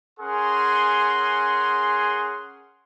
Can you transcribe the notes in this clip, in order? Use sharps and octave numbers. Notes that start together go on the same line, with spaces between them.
C#4 G#4 A#4 F#5 G#5 C6